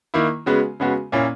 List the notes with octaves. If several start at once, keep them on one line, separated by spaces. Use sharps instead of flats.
D#3 A#3 E4
C#3 G#3 B3 F#4
C#3 G#3 B3 F#4
A#2 A#3 C#4 E4